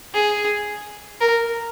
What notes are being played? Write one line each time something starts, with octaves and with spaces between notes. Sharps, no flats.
G#4
A#4